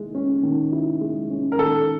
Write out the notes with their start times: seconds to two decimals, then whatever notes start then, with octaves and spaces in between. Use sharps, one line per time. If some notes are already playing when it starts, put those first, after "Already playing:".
Already playing: D#3 G#3 E4
0.15 C#4
0.43 D#3
0.72 E4
1.01 G#3
1.30 C#4
1.52 A#4
1.58 D#3 A4